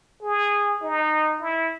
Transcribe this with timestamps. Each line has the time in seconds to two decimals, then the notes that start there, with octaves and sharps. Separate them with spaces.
0.22 G#4
0.82 D#4
1.41 E4